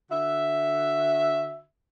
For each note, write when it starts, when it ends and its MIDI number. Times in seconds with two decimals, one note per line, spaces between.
0.10 1.62 50
0.10 1.62 66
0.10 1.62 76